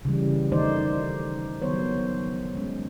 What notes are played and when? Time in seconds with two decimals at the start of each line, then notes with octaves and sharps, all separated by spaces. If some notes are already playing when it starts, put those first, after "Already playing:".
0.05 C#3 E3 G3
0.52 D#3 A3 D#4 C5 D5
1.61 D#3 F#3 B3 C5 C#5
2.55 G#3 C#4